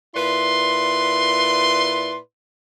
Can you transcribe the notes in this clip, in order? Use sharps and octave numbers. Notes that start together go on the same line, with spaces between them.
A#2 E4 B4 D5 C6